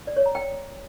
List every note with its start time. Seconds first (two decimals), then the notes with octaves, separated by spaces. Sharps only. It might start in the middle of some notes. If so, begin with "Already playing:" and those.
0.07 D5
0.16 C#5
0.26 A#5
0.35 G5